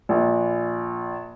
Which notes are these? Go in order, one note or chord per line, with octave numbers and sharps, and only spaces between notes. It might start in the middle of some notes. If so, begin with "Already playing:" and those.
A#1